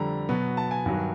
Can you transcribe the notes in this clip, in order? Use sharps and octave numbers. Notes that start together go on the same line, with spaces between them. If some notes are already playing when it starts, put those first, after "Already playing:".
Already playing: F2 D3 G3 A#5
B2 F#3 B3
A5
G#5
G2 D#3 F#3